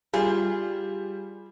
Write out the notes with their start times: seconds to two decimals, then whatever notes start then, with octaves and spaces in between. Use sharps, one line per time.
0.13 G3 F4 G#4